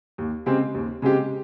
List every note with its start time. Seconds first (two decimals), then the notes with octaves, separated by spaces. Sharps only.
0.18 D#2
0.46 C#3 G#3 C4 G4
0.74 D#2
1.02 C#3 G#3 C4 G4